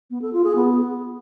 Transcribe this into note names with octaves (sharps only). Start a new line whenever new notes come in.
B3
A4
F4
G#4
B3